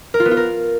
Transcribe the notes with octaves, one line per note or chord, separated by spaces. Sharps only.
A#4
F4
B3
F4
A#4